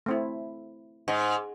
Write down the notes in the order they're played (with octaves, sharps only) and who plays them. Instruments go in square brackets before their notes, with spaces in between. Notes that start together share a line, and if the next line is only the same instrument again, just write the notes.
[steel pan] A3 C4 E4
[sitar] G#2 [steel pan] D#5